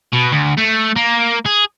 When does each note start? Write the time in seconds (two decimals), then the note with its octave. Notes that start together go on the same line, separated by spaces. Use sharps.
0.13 B2
0.32 D2
0.58 A3
0.96 A#3
1.46 G#4